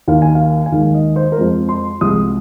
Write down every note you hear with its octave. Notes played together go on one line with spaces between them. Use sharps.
D#2 D#3 A#3 F5
G#5
F5
G#5
D#2 D#3 G#3 F5
D#5
C5
A#4
F2 F3 G#3 C5
C6
C2 C3 F3 G#3 D#6